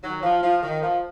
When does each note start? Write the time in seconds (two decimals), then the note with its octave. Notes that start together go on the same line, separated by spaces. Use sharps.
0.02 D#3 F#3
0.23 F3
0.42 F3
0.61 D#3
0.82 F3